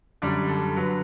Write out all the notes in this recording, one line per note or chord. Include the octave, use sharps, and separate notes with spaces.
F#2 D3 G3 D5
A4
D3 F#3 B4